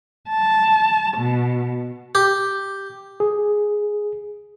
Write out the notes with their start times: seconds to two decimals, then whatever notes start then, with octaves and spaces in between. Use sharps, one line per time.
0.30 A5
1.17 B2
2.15 G4
3.20 G#4